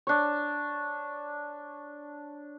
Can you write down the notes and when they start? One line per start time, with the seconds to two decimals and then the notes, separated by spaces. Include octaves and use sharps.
0.07 D4 C#5